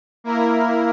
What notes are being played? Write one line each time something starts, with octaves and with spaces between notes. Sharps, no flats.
A#3 E4 A#4